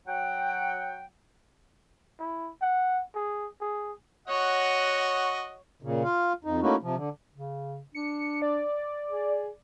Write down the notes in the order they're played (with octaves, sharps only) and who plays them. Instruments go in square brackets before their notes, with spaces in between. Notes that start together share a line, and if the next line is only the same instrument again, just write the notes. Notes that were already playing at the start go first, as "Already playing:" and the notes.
[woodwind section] F#3 F#5 G5
[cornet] E4
F#5
G#4
G#4
[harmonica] F#4 D#5 F#5 [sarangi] C#5
[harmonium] A#2 C#3
F4 F5
F2 D#4
A3 A#3 C#4 D#4 E4 F#4
C3 F3
D3
[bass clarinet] C#3
[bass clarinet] D4 [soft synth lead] C#7
[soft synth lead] D5
[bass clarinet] G#4